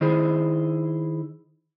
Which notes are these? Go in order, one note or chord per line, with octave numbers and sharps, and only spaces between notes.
D#3 E4 G#4 C5